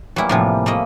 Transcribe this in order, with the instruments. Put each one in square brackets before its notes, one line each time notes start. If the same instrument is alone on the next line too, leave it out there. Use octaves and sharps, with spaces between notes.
[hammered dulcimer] E3 G3 A#3 [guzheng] F#3 E4
[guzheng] A2 C3 F3
[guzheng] A3 A#3 D#5 [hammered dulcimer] E5